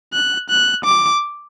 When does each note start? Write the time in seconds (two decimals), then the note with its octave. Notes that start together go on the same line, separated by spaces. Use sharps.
0.13 F#6
0.50 F#6
0.84 D6